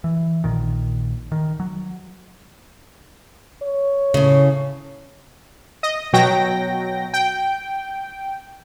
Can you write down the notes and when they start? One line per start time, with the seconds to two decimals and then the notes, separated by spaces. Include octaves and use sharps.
0.04 E3
0.44 A#1 A#2 D#3
1.32 D#3
1.60 F#3
3.62 C#5
4.14 A2 C#3
5.83 D#5
6.13 B2 F#3 G5 A#6
7.13 G5